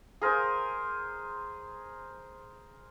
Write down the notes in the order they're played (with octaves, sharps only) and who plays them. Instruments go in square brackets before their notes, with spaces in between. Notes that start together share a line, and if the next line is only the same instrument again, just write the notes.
[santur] G#4 A#4 C5